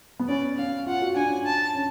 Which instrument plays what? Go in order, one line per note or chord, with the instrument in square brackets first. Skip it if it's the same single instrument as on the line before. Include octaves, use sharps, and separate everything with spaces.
[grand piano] B3
[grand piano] C#4 [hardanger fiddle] D5
[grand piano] C#4 [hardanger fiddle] F5
[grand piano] F4 [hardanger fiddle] F#5
[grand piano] F#4
[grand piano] D4 [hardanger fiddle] G#5
[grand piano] C#4
[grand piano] D4 [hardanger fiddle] A5
[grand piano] C#4